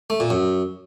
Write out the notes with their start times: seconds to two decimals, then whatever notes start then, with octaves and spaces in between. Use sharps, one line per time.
0.10 A3
0.20 A#2
0.30 F#2